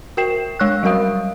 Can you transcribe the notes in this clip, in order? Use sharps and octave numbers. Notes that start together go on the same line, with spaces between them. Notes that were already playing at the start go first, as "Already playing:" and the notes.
F#4 A#4 G5 C7 E7
G#3 C#5 C#6 E6 F#6
F#3 G3 F#4 A#4 F5 D#6